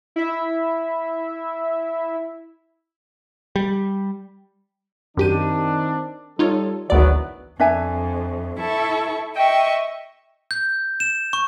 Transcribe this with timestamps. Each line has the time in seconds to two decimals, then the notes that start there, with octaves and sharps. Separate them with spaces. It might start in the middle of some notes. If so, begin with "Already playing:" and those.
0.16 E4 E5
3.56 G3
5.17 F#2 D#3 C4 D4 G4 D#7
6.39 G3 D#4 F4 A4 C#5
6.90 G#1 D2 E3 F#3 B3 D5
7.60 F2 D4 E5 G#5
8.58 E4 A4 C#6
9.35 D#5 E5 G5 C#6
10.51 G6
11.00 E7
11.33 C#6